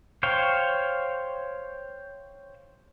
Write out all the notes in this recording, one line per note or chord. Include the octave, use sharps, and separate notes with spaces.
C5 C#5 F5 G5